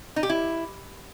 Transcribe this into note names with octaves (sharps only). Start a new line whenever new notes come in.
D#4
G4
E4